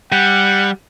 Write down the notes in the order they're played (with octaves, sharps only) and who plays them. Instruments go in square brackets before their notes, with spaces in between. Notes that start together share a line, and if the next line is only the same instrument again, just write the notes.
[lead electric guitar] G3 [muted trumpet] F#5